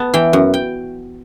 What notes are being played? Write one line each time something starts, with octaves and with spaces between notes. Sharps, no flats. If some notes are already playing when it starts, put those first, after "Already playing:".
Already playing: B3 A5
E3 G5
F#2
G5